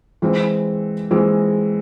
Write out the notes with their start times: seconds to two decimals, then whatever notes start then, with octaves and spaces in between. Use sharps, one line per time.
0.22 E3 G#3 C4
1.11 E3 G#3 C4